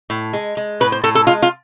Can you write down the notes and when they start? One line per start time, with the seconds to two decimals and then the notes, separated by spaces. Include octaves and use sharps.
0.10 A2
0.33 G#3
0.57 G#3
0.80 A2 B4
0.92 C5
1.03 A2 A4
1.15 A4
1.27 G#3 F4
1.42 F4